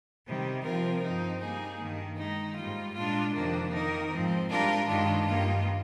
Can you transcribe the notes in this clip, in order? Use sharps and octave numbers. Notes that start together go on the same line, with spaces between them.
C3 D#3 G3
C3 F3 C4 F4 A#4
G2 F3 C4 D#4
G3 A#3 D#4 G#4
G2 D#3 A#3
D#3 G#3 D#4
G#2 G3 A#3 F4
A#2 G#3 D4 F4
F2 C3 D#3 A#3 D4
D#3 A#3 D#4 A#4
G#2 F3 C4
G#2 G3 D4 F4 A#4
G2 D#3 G#3 D4 F4
G2 D#3 A#3 F4